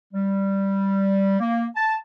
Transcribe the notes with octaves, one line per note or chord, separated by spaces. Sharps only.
G3
A#3
A5